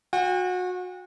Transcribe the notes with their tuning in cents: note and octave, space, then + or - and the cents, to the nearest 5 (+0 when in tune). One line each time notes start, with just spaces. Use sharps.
F#4 -30 G5 +35